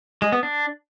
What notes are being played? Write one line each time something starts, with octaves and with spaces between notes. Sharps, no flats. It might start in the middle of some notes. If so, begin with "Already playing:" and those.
G#3
B3
D4